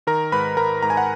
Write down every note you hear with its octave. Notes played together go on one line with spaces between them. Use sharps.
D#3 A#4 A#5
G#2 B4 B5
G#2 A#4 A#5
G#2 A#5
G#5
F#5